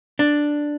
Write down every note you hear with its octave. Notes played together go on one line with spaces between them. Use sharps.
D4